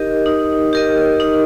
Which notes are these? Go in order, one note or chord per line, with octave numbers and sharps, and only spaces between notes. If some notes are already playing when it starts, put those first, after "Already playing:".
Already playing: D#4 G4 A#4 D#5
D#4
G4 A#4 D#5
D#4